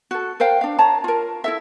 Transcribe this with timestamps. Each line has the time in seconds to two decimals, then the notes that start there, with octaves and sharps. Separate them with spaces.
0.11 F#4 A4
0.40 A#4 C5 F5 G5
0.61 D4 F5
0.78 C#5 A5 A#5
1.04 F4 A#4
1.44 E4 A4 E5